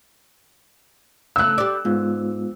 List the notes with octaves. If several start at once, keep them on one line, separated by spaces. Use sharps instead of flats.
C#3 A3 E6 F#6
G3 D5
G#2 G#3 B3 F4